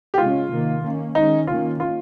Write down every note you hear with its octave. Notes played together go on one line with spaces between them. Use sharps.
G4
C#3 G#3 C#4 F4
C3 D#3 A#3
D#3 A#3 C#4
D#3 G#3 C#4 D#4
D#3 A#3 C#4 F4
F4